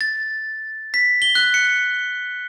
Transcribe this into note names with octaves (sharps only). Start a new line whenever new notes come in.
A6
B6
G7
F#6
C#7